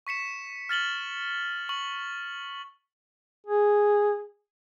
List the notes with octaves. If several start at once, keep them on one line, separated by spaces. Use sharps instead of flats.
C#6 B6 C#7 E7
F6 A6 F#7 G7
C#6 F#7
G#4